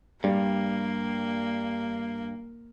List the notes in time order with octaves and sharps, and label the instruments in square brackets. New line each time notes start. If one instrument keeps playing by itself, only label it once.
[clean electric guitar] G2 [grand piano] G3 [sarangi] A#3